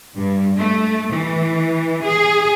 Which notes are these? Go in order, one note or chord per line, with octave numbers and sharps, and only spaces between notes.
G2
A3
E3
G#4